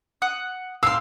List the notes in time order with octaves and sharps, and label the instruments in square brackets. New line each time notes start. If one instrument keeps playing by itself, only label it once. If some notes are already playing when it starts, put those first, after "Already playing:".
[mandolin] F#5 D#6
[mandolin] F5 G5 C6 [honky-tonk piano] E6